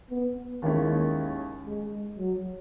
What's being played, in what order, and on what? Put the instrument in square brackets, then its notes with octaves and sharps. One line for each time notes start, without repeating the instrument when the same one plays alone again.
[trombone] B3
[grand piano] D#2 D#3 G#3 C#4 E4 [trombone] A#3
[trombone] G#3
F#3